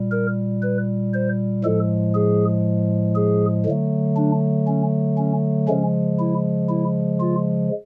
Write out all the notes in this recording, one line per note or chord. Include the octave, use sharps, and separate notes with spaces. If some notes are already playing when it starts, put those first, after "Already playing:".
Already playing: A#2 G3
A#4
B4
C5
A2 F3 G#3 A4
G#4
G#4
D3 F#3 A3
D4
C#4
C#4
C#3 F3 G#3 C#4
E4
E4
F4